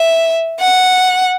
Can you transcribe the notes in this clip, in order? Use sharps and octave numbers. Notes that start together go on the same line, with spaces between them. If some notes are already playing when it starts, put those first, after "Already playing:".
Already playing: E5
F#5